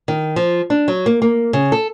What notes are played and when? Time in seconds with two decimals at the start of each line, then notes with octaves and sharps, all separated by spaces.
0.08 D#3
0.36 F3
0.70 D4
0.88 F#3
1.06 A#3
1.22 A#3
1.53 C#3
1.72 A4